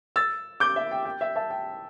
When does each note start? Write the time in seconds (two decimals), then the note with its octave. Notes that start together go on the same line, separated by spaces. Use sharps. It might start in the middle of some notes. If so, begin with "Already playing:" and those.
0.16 E6 A6
0.60 D6 G6
0.76 E5
0.91 G5
1.05 G5
1.21 E5
1.36 E5 A5
1.50 G5